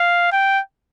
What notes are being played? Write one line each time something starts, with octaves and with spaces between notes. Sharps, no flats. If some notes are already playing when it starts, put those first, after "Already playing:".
Already playing: F5
G5